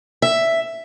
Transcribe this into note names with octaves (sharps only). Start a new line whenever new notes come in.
E5